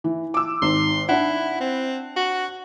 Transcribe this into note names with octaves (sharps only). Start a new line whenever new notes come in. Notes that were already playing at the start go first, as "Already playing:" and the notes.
E3
D6 E6
G#1 C6
D4 E4 F#5
C4
F#4